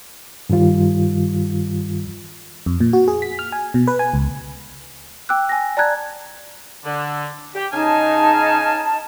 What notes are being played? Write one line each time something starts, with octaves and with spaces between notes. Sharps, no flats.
G2 D#3 G3 F4
F2
A#2
F#4
G#4
B6
F6
G#5
B2
B4
G#5
C#2
G5 D6 E6 F#6
G#5 A#6
D5 A5 A#5 F#6 G#6
D3
G4
C#3 D#4 F5 G#5 A5